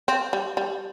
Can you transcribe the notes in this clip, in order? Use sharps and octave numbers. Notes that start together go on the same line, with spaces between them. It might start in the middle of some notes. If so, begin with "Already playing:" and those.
C4
G3
G3